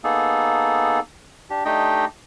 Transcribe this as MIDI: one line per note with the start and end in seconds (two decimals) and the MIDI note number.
0.04 1.00 58
0.04 1.00 59
0.04 1.00 63
0.04 1.00 68
0.04 1.00 69
1.50 1.64 62
1.50 1.64 67
1.65 2.05 57
1.65 2.05 62
1.65 2.05 63
1.65 2.05 67
1.65 2.05 75
1.65 2.05 79